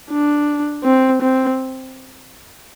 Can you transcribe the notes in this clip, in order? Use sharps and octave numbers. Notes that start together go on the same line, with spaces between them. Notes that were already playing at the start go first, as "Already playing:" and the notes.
D4
C4
C4